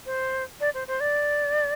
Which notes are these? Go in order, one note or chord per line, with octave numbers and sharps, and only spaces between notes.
C5
D5
C5
C5
D5